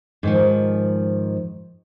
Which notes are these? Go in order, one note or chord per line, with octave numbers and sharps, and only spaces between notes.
G#2 D#3 F3